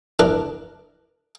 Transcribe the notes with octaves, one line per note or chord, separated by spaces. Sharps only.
D4 E4 A#4 B4